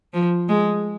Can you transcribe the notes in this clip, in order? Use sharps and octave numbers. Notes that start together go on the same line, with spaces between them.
F3
G#3